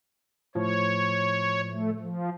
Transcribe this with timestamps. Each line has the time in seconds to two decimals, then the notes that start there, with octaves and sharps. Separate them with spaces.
0.55 A2 F3 C#5
1.71 A3
2.00 F3